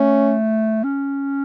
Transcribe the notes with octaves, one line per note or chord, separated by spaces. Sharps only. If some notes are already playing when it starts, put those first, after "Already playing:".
Already playing: A3 C#4
C#4